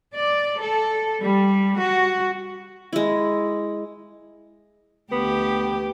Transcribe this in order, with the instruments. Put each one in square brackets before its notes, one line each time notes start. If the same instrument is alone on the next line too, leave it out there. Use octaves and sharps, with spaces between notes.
[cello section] D5
A4
G3
F#4
[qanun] G#3 E4
[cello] D2 G4 [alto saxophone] B3